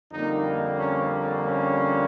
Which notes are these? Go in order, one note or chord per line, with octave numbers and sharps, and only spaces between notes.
F2 D3 G3 A#3 D#4
C#4
C#4